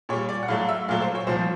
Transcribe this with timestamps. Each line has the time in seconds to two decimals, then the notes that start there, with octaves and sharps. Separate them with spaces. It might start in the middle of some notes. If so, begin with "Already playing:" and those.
0.09 A#2 C#5
0.13 G3
0.29 D5
0.43 F#5
0.48 A2 F#3 A3 F5
0.69 E5
0.89 A#2 F#3 A3 F5
1.01 C5
1.15 C#5
1.27 C2 A#2 F3 C5